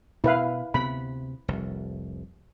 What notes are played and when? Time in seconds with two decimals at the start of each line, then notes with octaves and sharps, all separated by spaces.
0.24 B2 E4 B4 F5
0.74 D2 C3 B3 B5
1.48 F1 C2